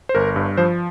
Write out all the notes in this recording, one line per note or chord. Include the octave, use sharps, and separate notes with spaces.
C5
G1 A#4
G2
F3 C5